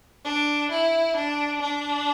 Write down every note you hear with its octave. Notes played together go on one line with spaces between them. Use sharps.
D4
E4
D4
D4